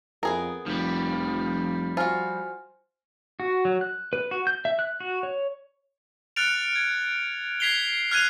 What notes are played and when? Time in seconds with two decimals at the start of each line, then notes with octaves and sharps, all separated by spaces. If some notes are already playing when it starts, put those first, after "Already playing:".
0.23 F2 B3 G#4 A#4
0.66 F1 F3 G3
1.97 F4 F#4 C5 G#5 F6
3.40 F#4
3.65 F#3
3.81 F#6
4.13 B4
4.31 F#4
4.47 G6
4.65 E5
4.79 F#6
5.00 F#4
5.23 C#5
6.36 F6 F#6 A6 C#7 D7 F7
6.76 G#6
7.60 G#6 B6 C7 F7 G7
8.11 F6 F#6 G#6 C7 D#7 F7